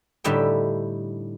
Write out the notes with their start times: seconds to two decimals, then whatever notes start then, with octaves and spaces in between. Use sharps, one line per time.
0.24 A2 D3 G3 D#4 E5 G5